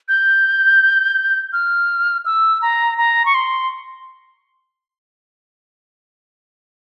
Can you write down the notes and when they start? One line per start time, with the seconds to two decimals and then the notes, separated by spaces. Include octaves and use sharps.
0.09 G6
1.53 F6
2.26 E6
2.62 A#5
2.98 A#5
3.26 C#6
3.35 C6